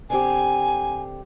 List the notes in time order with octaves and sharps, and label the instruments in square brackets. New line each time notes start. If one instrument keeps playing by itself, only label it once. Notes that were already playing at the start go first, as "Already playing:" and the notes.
[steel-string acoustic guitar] D3 C4 G4 [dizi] G#5